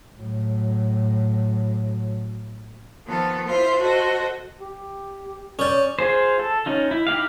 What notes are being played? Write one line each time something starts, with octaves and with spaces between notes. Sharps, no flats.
A2 F#3
D#3 F3 B3 A4
E4 F4 C5
F#4 A4 C5 D#5
G4
C#4 A4 C#5 D5
F4 G#4 C5
A4
C#4 D#4 F4
E4
D#4 E4 G4 F5